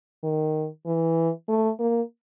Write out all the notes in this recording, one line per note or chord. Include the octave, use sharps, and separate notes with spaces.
D#3
E3
A3
A#3